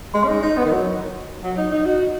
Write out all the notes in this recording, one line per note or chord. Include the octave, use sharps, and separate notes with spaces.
G#3
C#4
D#4
D#4
B3
D#3
F#3
F#3
D#4
D#4
F#4